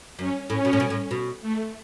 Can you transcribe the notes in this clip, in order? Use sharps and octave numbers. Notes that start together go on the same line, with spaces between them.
F#2 C#4
A2 C#4
B2
A2
B2
A2
B2
A3